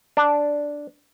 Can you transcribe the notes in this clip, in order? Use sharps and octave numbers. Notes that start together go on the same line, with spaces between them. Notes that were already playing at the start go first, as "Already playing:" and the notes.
D4